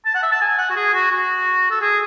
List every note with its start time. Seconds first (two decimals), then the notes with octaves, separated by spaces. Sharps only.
0.05 A5
0.14 F#5
0.23 E5
0.32 A5
0.41 G#5
0.58 F#5
0.70 F#4
0.76 G#4
0.94 F#4
1.11 F#4
1.70 A4
1.81 G#4